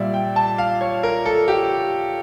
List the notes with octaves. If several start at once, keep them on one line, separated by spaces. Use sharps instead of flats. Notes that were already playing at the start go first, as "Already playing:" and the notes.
Already playing: A#2 G3 D5 E5
G5
A5
F5
C#5
A#4
A4
G4